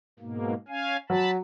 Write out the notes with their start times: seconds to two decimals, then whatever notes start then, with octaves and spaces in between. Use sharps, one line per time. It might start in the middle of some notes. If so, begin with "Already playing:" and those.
0.20 G#2 B2 A#3
0.68 C#4 F5 G#5
1.10 F#3 A5 B5